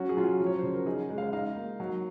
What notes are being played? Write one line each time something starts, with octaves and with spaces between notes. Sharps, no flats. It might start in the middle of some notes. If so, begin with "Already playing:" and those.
Already playing: F#3 C#4 F#4
G#4
F#3 F4
F#4
F3
C#5
C#3 C5
A#4
D#4 G#4
G#3
F5
D#4 F5
A#3
F#3